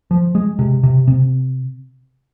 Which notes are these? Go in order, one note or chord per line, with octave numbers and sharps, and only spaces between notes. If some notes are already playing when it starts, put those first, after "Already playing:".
F3
G#3
C3
C3
C3